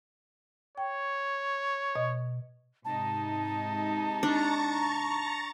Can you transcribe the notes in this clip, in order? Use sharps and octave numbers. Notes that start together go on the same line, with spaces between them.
C#5 G5
B2 D#5
G#2 C3 D#4 A5
D4 A#5 C#6 A6